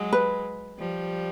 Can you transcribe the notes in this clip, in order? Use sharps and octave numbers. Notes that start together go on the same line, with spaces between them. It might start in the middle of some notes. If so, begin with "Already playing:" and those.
Already playing: F#3 G#3
B4
F3 G3